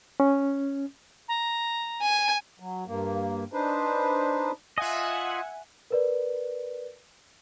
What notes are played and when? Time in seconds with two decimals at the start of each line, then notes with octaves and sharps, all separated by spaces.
0.20 C#4
1.28 A#5
2.02 G#5
2.60 F#3
2.87 G2 A#3
3.53 D4 D#4 B4 C5
4.78 F4 D#5 E5 F#5 G#5
5.91 A#4 B4 D5